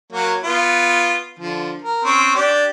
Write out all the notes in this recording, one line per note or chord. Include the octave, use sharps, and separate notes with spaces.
F#3 A#3 C#5
B3 F4
D3 F3
A#4
C4 C#4
D4 G4 D5